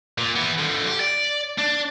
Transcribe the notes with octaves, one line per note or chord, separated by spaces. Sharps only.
A#2
E3 B3
D3 F3
G4
D5
D4